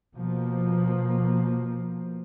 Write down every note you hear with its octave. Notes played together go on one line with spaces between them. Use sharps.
B2 F3 A#3